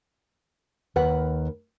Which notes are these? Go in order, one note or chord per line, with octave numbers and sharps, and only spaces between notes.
D#2 A#4 B4 F#5